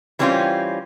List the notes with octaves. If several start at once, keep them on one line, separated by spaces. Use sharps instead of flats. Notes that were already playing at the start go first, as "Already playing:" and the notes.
E3 G3 C4 C#4 D#4 F4